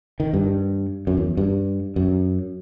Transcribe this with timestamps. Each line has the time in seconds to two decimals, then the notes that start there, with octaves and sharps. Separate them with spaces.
0.20 D#3
0.34 G2
1.07 F#2
1.17 E2
1.37 G2
1.96 F#2